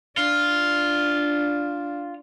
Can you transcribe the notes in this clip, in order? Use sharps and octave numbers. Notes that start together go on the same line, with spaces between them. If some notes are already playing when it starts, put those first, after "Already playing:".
D4 F4